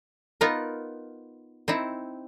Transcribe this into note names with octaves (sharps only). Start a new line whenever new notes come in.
B3 D#4 F4 A#4
C4 D#4 E4